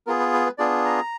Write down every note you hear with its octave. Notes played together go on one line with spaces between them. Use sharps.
B3 F4 G#4 A#4
B4
B4
B4
B3 D4 F4 G#4 D5
A#5